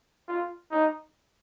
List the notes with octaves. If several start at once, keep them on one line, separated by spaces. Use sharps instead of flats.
F4
D#4